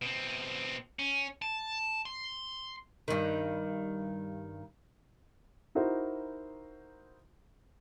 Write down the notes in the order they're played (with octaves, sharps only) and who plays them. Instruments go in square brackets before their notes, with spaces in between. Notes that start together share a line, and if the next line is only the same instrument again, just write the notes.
[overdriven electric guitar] B2 C4
C#4
A5
C6
[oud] G2 D#3
[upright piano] D#4 E4 F#4 A#4 C5